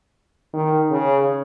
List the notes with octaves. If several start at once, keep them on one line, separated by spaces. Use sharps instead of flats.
D#3
C#3